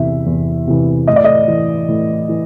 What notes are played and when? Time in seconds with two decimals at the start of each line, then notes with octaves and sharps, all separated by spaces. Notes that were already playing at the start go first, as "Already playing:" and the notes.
Already playing: E2 C3 E3 E5
0.26 E2
0.67 C3 E3
1.08 A2 D#5
1.16 D5
1.24 D#5
1.48 E3
1.88 A2
2.29 E3